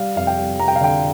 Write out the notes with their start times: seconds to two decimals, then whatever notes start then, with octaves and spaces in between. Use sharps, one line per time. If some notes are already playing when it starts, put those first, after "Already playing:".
Already playing: G3 F5
0.16 F2 F5
0.27 G5
0.38 G3
0.59 G3 A#5
0.68 G5
0.76 F5
0.81 D3 G5